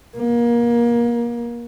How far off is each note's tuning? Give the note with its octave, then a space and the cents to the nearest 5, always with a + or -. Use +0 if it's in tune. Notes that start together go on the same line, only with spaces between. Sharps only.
A#3 +25